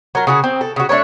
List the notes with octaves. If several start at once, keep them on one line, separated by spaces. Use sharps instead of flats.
F#3 A#4
C#3 F#4 G#4
C4
A4
C#3 F#4
A3 D4 A#4 C#5